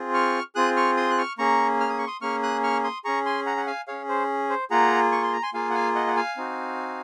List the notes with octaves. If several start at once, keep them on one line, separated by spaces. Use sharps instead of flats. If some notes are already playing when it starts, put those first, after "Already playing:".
Already playing: C4 F4 G#4
C#6 F6
C4 F4 G#4 D#6 F#6
C#6 F6
C6 D#6
F#6
C#6 F6
A#3 C#4 G#4 A#5 C#6
F6
D#6
C#6
C6 D#6
A#3 C#4 G#4 C#6 F6
D#6 F#6
C#6 F6
C6 D#6
C#4 G#4 A#5 C#6
G#5 C6
F#5 A#5
F#5
F5 G#5
C#4 G#4 C#5 F5
C5
C5
A#3 F4 G#4 F#5 A#5
C#6
C6
A#5
G#5 C6
A#3 F4 G#4 F5 G#5
F#5
F5 G#5
D#5 F#5
F#5
F5 G#5
C4 D#4 F#4